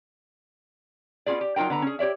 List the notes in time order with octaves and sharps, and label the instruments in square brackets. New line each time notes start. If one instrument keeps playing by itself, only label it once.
[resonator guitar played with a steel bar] B3 C#4 F4 G#4 D5
G4
F#3 D#4 F4 A#4 G5
D3 B3 A#5
C#4 G#4
G4 C#5 D5 E5